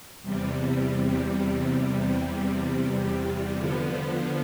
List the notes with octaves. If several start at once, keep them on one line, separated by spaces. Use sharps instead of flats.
E2 C3 G3
D3 F3 B3